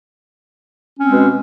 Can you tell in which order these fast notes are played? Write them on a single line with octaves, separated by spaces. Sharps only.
C#4 C4 G#3 B2